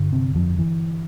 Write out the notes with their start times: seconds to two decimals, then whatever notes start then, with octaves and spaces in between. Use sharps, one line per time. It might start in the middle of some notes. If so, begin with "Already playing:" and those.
Already playing: G2 D3
0.12 C3 C4
0.35 F2 F3
0.59 E3